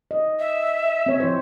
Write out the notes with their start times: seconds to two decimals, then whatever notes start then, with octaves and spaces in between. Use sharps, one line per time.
0.11 D#5
0.40 E5
1.06 C4 C#5
1.20 F3 E4 C5